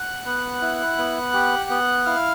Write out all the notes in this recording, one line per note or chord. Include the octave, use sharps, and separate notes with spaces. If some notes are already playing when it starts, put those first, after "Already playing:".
Already playing: F#5 F#6
B3
E4
B3
G4
B3
E4 F5 F6